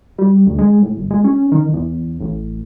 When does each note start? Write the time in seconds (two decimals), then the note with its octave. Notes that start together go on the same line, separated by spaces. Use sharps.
0.18 G3
0.47 D2
0.58 G#3
0.82 A2
0.97 G1
1.10 G#3
1.24 C#4
1.52 D#3
1.73 E2
2.20 A1